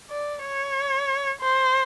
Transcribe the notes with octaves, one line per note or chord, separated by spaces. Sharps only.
D5
C#5
C5